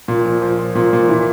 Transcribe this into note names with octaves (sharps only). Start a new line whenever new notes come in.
A#2
F3
F3
F3
A#2
A#2
E3